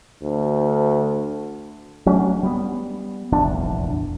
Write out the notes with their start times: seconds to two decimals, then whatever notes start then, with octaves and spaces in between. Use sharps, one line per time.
0.22 D2
2.06 F#3 A3 C#4 D4
2.43 G3 B3
3.32 F1 A#1 E2 D4